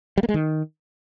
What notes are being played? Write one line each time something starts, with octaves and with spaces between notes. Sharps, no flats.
G3
A#3
G#3
D#3